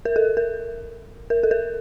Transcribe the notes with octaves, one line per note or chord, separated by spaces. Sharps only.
A#4
A4
A#4
A#4
A4
A#4